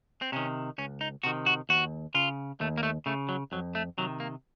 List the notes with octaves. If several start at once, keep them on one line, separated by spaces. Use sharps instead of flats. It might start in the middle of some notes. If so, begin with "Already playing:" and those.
C4
C3 D#3 C#4
C#2 C#4
D#4
C3 D#3 F#4
F#4
D#2 F#4
C#3 F4
D#2 A3
A#3
A3
C#3 A3
F#3
F2 F#3
A3
C3 D#3 F#3
A#3